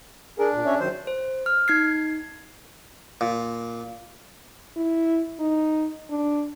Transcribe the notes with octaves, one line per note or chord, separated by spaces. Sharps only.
D4 G#4 A#4
A#2
C#4 C#5 E5
D#3 F#3 C5
C5
F6
D#4 G#6 C7
A#2
E4
D#4
D4